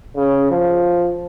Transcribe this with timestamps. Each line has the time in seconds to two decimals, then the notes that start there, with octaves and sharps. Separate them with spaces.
0.17 C#3
0.51 F3